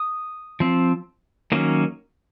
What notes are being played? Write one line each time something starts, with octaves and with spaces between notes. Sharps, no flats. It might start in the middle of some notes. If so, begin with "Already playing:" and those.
Already playing: D#6
F3 C4
D#3 F#3 A#3 C#4